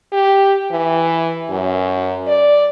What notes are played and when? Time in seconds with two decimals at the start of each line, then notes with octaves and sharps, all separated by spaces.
0.12 G4
0.71 E3
1.50 F#2
2.28 D5